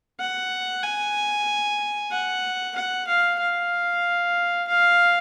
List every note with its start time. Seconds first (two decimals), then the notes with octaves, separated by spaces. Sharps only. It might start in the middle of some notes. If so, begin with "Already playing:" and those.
0.20 F#5
0.83 G#5
2.12 F#5
2.76 F#5
3.07 F5
3.40 F5
4.68 F5